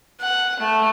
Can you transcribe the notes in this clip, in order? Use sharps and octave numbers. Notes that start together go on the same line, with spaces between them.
F#5
A3